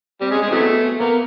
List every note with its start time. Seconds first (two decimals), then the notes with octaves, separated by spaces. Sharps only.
0.21 G3 C4
0.31 G#3
0.35 C#4
0.42 G#3
0.48 E3 F#3 A3 C4
0.61 B3
1.00 A#3 B3